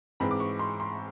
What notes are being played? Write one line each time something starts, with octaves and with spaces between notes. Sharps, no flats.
G#2 E3 G#3 C4 B5
D6
C#6
C6
C6